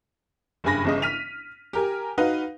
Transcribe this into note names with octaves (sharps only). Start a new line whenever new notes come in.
F#1 G2 G4 G#5 B5 A#6
G1 C#3 D#5
F6 B6 D#7 F7
G4 A#4 G#5
D#4 F#4 B4 F5